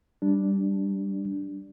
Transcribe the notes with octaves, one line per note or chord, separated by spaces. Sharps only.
G3 D4